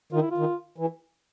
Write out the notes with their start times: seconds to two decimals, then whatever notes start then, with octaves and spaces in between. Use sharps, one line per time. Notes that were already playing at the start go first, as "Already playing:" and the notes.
0.13 D#3 F4
0.21 E4
0.31 F4
0.38 D#3
0.78 E3